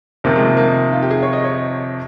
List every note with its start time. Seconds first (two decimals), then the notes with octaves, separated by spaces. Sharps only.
0.24 F2 C3 D#3 A#3
0.36 G#3
0.46 A#3
0.57 A#3
0.68 D#4
0.93 F4
1.02 G4
1.11 G#4
1.23 C#5
1.33 D#5
1.44 C#5